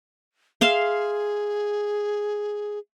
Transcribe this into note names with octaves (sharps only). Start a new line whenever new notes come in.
G#4 E5 F5 C6